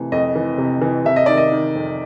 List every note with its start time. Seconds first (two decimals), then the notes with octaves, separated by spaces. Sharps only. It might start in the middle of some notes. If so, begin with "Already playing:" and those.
Already playing: F2 C3 E3 A3
0.12 F2 D#5
0.35 E3
0.58 C3
0.81 E3
1.05 C3 E5
1.16 D#5
1.26 D#3 D5
1.37 D#5
1.52 D#3
1.75 F2